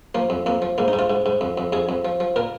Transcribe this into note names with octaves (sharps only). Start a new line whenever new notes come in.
F3 A#3
F2
F2 A#3
F3
G#2 A#3
D#4
G#2
F4
G#2
G#2
F2
F2
F2 G#4
F2
F3
F3
A#2 A#4